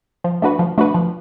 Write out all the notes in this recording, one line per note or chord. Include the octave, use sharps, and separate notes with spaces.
F3
A3 D4 F#4 B4
F3
A3 D4 F#4 B4
F3